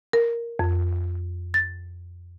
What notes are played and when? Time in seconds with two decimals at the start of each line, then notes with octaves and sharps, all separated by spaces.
0.13 A#4
0.59 F2
1.54 A6